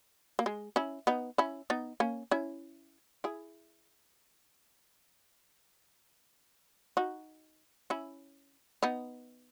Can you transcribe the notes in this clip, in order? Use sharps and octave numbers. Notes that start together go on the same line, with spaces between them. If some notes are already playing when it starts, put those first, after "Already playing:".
A#3
G#3
C#4 E4
B3 D#4
C#4 E4
B3 D#4
A#3 C#4
C#4 E4
E4 G#4
D#4 F#4
C#4 E4
B3 D#4